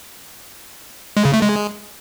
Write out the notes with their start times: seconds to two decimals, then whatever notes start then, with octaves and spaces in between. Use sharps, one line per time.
1.17 G#3
1.25 C#3
1.34 A3
1.42 G#3